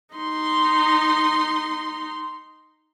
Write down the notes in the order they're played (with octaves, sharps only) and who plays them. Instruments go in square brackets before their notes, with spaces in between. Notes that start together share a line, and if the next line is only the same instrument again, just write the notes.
[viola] D#4 C6